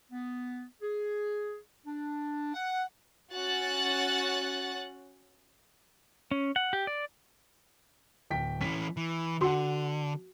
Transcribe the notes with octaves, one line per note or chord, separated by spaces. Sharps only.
B3
G#4
D4
F#5
C#4 F#4 F#5 F#6 A6
C#4
F#5
G4
D5
D1 G5 B6
E3 C#4 B6
E3
D3 F#4 F#5 C6